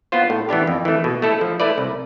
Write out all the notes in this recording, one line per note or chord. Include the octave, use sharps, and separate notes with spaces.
B3 F4 C5
A2
E3 B3 D4 G4
F2
E3 A3
B2
A3 E4 A4
F3
A3 E4 B4 D5
C2